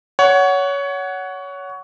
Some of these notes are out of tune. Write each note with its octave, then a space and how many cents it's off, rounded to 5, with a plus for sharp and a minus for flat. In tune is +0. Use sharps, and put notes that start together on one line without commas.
C#5 +20 F#5 +5